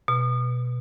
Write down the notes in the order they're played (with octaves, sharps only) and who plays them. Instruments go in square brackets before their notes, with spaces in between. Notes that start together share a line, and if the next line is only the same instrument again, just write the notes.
[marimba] B2